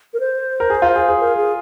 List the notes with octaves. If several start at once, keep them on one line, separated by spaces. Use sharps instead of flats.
A#4
C5
A#4
G#4
F4
G#4
G#4
A#4
G#4